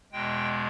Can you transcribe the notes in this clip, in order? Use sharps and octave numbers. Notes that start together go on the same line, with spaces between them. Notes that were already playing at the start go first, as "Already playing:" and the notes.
E2 B2 G#3 G5